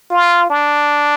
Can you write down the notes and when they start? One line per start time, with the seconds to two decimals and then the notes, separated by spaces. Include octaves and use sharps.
0.10 F4
0.50 D4